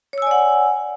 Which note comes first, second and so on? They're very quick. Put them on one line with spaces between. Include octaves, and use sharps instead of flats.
C#5 E6 G#5 D5 F#5